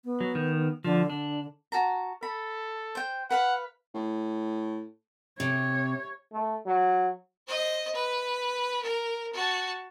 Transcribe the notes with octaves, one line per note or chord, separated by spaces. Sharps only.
B3
F#3
D#3
D3 F3
D3 D4
F#4 A5 A#5
A4 B5
C5 G5
B4 F5 F#5 B5
A2
C3 C#5
A3
F#3
C5 D#5
B4
A#4
F#4 A5